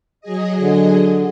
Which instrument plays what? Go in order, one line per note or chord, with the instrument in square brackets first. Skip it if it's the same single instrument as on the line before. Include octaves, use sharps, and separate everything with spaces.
[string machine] F#3 G#4 D#5
[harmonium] D3